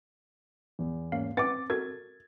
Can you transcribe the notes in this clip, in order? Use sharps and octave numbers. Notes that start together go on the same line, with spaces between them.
E2
G#2 A#3 C#4 F5
C4 B4 F#5 G#5 D6 A6
F#4 A4 A#4 G#6